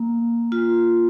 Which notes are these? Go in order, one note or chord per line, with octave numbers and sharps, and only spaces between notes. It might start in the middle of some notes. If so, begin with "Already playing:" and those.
Already playing: A#3
F4